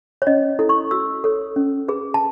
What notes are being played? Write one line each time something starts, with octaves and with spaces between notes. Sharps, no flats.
C#5
C#4 D#5
E4 A4
C#6
F#4 E6
A4 C#5
C#4
G#4 B4
A5